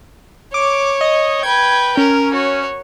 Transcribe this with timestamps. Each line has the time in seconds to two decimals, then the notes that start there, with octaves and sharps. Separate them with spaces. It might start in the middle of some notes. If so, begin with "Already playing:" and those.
0.54 C#5 D6
1.01 D#5
1.43 B4 G5 G#6
1.97 C#4 A#4
2.33 F#4 C#5